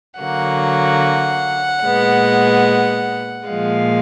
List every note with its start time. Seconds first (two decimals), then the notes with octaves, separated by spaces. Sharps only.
0.19 D3 F#3 A#3 F#5
1.83 A#2 G#3 B3
3.48 A#2 F3 G#3 F5